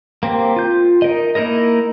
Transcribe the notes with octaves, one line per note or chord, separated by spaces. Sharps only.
A#3 C4 G4
F4 G6
D#4 A#4 D#5
A#3 D#4 E4 A#4 D#5